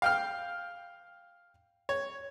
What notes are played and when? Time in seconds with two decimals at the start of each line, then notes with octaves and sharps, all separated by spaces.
0.02 F5 G5 F6
1.89 C#5